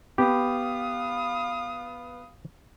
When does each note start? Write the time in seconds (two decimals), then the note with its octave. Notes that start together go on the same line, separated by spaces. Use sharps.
0.18 B3 G4 F5 D#6